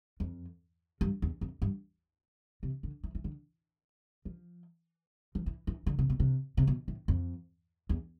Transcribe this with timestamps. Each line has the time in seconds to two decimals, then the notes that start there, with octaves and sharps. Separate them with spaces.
0.20 F2
1.01 G2
1.22 E2
1.41 F2
1.62 G2
2.63 C3
2.83 D3
3.04 E3
3.15 E3
3.24 D3
4.25 F3
5.35 F3
5.46 E3
5.67 E3
5.87 D3
5.99 C3
6.10 B2
6.20 C3
6.57 C3
6.67 B2
6.88 A2
7.08 F2
7.89 E2